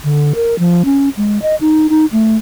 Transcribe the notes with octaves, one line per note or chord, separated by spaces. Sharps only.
D3
A#4
F3
C#4
G#3
D#5
D#4
D#4
A3